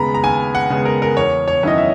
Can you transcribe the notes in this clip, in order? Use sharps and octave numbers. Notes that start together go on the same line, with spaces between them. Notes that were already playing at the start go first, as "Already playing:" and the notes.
Already playing: D#2 C#3 G#3 B3 A#5 B5
A#5
D#2 G#5
F#5
C#3 G#3 B3
A#4
A#4
E2 C#5
C#5
D#3 F#3 C#4 E4 D#5
E5